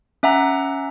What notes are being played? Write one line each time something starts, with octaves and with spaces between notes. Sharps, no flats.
C#4 E5 F#5 A#5